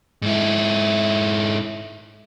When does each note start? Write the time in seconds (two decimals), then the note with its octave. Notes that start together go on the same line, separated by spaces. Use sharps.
0.22 G#2 E4